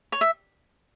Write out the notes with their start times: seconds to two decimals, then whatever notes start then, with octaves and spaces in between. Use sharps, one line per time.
0.12 C#5
0.21 E5